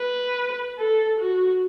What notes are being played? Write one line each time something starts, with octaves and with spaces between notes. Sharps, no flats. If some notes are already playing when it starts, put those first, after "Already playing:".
Already playing: B4
A4
F#4